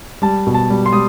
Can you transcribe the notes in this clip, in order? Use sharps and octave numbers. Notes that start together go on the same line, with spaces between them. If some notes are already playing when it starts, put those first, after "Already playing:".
G3 A5
B2
A5
G3
C6
G3 D#6